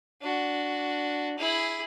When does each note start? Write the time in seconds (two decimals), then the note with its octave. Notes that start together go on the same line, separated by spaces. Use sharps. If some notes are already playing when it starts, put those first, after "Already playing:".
0.22 D4 F#4
1.38 E4 G#4